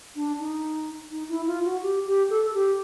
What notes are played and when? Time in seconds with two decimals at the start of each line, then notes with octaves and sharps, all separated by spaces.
0.15 D4
0.40 D#4
1.11 D#4
1.29 E4
1.47 F4
1.65 F#4
1.82 G4
2.06 G4
2.30 A4
2.54 G4